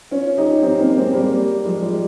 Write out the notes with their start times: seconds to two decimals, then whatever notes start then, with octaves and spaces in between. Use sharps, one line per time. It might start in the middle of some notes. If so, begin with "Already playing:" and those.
0.11 C#4 F4
0.38 D#4 G4
0.62 C4 D#4
0.80 A#3 C#4
0.97 G#3 C4
1.14 G3 A#3
1.65 F3 G#3
1.82 G3